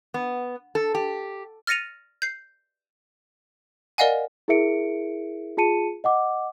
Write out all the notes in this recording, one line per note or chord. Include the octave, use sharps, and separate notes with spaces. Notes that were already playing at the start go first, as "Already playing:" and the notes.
B3
A4
G4
F6 A6 A#6 C#7 D#7 F7
G6 C7
A#4 D5 D#5 F5 F#5 G#5
E4 G#4 A#4 E5 C#7 D7
F4 G#4 A5 C#7 D#7
D#5 F#5 D6